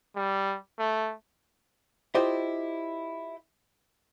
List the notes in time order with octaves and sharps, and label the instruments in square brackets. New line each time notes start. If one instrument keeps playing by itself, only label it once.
[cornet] G3
A3
[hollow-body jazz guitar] E4 F4 G4 C5 D#5